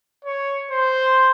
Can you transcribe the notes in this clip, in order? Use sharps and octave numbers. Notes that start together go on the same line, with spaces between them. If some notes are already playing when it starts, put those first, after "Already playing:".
C#5
C5